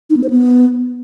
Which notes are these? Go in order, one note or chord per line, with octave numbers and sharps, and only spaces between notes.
D#4
B3
C5
B3